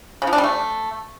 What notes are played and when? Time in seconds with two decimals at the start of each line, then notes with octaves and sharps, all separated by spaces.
0.22 C#3
0.27 F3
0.33 D4
0.38 G3
0.44 A3